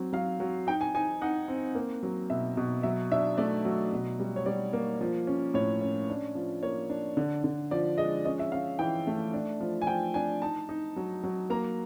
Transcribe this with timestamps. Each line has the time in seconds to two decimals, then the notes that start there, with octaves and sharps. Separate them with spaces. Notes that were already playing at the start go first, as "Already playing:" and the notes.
Already playing: F#3 C4
0.13 F#3 F5
0.40 F#3
0.67 D#4 G5
0.81 G#5
0.95 D#4 G#5
1.21 D#4 F#5
1.48 C4
1.75 A#3
2.03 F#3
2.30 B2 E5
2.57 B2
2.83 F#3 E5
3.11 D4 E5
3.38 A3 D5
3.65 F#3
3.93 B2
4.20 G3
4.36 C#5
4.46 G3 D5
4.73 A#3
5.01 F3
5.27 C#4
5.54 A2 C#5
5.81 C#4
6.09 D4
6.35 F3
6.63 A#3 C#5
6.90 D4
7.17 D3
7.44 D3
7.71 F3 D5
7.98 G#3 D#5
8.25 C#4 D#5
8.39 E5
8.52 C#4 F5
8.79 E3 G5
9.07 A3
9.34 D4
9.60 F3
9.82 G#5
9.87 F3 G5
10.14 D4 G#5
10.42 D#4 A5
10.69 D#4
10.96 F#3
11.23 F#3
11.50 A#3 A#5